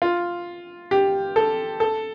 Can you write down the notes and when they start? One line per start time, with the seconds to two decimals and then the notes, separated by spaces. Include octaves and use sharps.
0.02 F4
0.91 G4
1.36 A4
1.80 A4